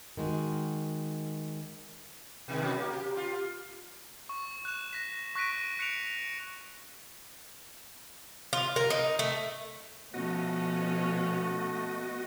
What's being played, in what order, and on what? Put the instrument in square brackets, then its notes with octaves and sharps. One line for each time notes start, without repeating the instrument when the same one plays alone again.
[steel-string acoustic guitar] D#3 G#3 F#4
[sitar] B2 D#3 G#3
B2 F#3 C#4
A#3
G4
F4 G4
[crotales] C#6
F#6 E7
A#6 B6
C#6 F#6 A#6 B6 D7 D#7
F#6 C#7 D7 F7
[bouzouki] F4
A#4
D#4
A3
[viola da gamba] B2 F3 C#4 [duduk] A3 [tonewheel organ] B3 F#4 D#5